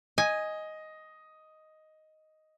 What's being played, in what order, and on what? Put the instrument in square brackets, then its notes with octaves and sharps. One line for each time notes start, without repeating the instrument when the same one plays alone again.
[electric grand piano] D#5 [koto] G#5